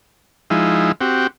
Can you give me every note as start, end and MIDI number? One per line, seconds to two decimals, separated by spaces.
0.50 0.92 53
0.50 0.92 56
0.50 0.92 63
0.50 0.92 64
1.01 1.27 60
1.01 1.27 66
1.01 1.27 67